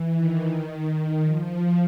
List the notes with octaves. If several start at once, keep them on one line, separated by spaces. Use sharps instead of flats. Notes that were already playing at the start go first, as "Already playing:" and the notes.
Already playing: E3
D#3
F3